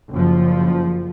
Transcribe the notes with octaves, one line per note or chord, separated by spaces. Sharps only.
F#1 F3